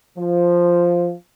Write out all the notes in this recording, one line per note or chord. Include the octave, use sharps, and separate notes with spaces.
F3